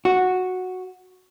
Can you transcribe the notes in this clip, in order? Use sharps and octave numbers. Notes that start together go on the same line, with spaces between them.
F#4